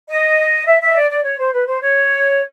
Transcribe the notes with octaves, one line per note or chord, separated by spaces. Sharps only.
D#5
E5
E5
D#5
D5
D5
C#5
C5
B4
C5
C#5